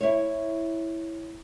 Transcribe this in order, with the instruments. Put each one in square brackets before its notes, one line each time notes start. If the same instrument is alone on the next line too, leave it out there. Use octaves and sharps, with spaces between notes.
[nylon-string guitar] E4 C#5